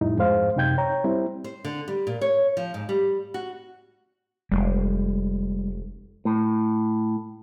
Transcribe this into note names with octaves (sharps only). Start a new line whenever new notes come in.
F2 A2 G3 D#4 E4
F2 G#2 G#3 C5 F5
F#2 C3 D#4 G5 G6 G#6
C#5 G5 A#5
G3 C4 E4
C5
D3
G3
A#2
C#5
F3
G#2
G3
F#4
F1 G3 G#3
A2